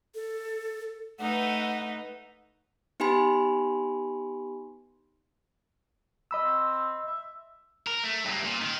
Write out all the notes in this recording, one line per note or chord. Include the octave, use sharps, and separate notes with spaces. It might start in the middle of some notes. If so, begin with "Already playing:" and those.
A4
A3 D#4 B4 F#5
B3 D#4 G4 G#5 B5 C6
D#5 B5 E6
C4
E5
A#4
A3
G2 A#3
A#2
D#3